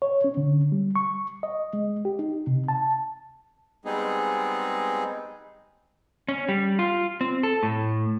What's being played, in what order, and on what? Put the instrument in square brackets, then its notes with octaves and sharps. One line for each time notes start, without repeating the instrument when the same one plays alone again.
[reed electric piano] C#5
C#4
D3
G3
C#6
D#5
G#3
G4
D#4
C3
A5
[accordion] G3 G#3 B3 C4 D#4 G#4
[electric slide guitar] C#4
G3
F4
C4
A4
A2